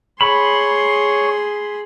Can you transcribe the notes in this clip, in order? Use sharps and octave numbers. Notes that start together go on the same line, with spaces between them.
G#4 C#5 B5 C6